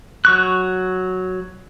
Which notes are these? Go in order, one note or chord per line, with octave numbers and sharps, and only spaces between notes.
F#3 C#6 F#6